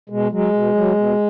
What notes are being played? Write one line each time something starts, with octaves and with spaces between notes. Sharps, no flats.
B2 G#3
F#3 G#3
B2
F#3
B2